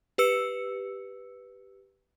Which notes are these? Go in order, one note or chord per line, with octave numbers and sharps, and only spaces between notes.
G4 B4 E6 C#7